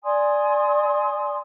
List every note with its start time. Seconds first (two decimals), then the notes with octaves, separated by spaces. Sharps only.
0.03 D5 G#5 C6 D#6